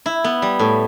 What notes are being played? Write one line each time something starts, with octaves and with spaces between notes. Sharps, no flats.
E4
B3
G3
A2